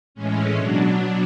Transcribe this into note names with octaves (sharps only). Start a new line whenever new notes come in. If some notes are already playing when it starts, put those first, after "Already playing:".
A2 E3 G#3 C#4
B2 F#3 D4